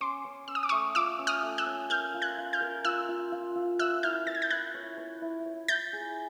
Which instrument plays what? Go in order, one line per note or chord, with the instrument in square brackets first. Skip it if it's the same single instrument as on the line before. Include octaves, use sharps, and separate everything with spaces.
[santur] C#4 [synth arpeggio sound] C6 D6
[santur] C#4
[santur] C#4 [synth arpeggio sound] E6
[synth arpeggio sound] D#6
D6
[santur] A3 [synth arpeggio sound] C#6 D#6
[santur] F4 [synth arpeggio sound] D6 E6
[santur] C#4
[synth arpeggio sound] D#6 F6
[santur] A3
[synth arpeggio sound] E6 F#6
[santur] C#4
[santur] A#4 [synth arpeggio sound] F6 G6
[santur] F4
[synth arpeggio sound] F#6 G#6
[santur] F4
[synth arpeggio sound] F6 G6
[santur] A#4
[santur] F4 [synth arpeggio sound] E6 F#6
[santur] F4
F4
F4
[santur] E5 [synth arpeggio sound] E6 F#6
[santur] E4 [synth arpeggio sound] F6 G6
[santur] E5 [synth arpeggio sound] A6
[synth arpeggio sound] G#6
G6 A6
[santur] E4 [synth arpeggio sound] F#6 G#6
[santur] C#5
C#5
E4
C#5
[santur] E4 [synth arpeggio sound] G6 A6
[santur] G#4